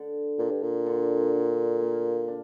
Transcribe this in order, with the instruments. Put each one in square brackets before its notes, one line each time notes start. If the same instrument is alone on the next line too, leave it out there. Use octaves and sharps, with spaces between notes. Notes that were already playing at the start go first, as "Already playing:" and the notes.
Already playing: [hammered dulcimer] D3
[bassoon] A#2 [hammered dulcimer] D4
[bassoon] G2
A#2
[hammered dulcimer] D3
D3
A#3
D4